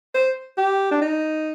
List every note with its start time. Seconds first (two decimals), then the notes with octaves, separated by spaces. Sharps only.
0.14 C5
0.58 G4
0.91 D4
1.01 D#4